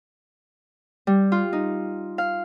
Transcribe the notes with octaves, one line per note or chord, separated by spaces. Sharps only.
G3
F4
D#4
F5